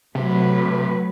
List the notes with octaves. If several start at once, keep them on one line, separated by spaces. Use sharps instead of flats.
C3 F#3 A3 B4